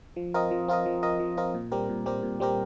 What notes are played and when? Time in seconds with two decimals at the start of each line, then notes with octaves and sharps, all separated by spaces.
0.16 F3
0.34 C4 F4 A#4 D#5
0.51 F3
0.68 C4 F4 A#4 D#5
0.86 F3
1.03 C4 F4 A#4 D#5
1.20 F3
1.37 C4 F4 A#4 D#5
1.54 A#2
1.72 G3 C4 G4 A#4
1.89 A#2
2.06 G3 C4 G4 A#4
2.23 A#2
2.40 G3 C4 G4 A#4